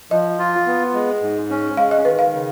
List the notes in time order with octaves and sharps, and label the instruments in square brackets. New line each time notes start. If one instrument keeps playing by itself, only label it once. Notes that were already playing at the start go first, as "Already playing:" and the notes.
[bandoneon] F3 [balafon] D#5
[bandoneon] F4
B3
G#3
G#2
C#4
[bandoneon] G#3 [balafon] F5
[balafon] D#5
[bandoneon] D#3 [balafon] B4
[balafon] F5
[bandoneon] C#3